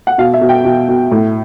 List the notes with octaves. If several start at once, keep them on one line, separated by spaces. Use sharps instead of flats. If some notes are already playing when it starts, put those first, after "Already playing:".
F#5
B2 F5
E5
B2
G5
B2
B2
A2